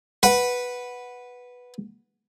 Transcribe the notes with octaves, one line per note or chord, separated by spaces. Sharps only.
B4 F#5